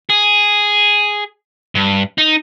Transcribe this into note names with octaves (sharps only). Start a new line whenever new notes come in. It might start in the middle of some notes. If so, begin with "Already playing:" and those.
G#4
G2
D#4